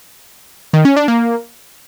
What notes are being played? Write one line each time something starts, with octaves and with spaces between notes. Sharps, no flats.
D#3
C#4
D4
A#3